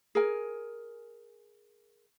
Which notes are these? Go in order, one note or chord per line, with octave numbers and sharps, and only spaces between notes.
G#4 A#4 G#5